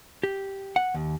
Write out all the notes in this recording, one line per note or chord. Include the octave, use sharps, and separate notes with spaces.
G4
F#5
D#2